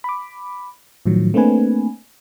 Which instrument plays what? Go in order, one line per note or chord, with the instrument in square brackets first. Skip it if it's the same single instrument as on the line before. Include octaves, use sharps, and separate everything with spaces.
[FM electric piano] B5 D6
A2 D#3 F3 F#3
A3 A#3 C4 D4 B4 G#5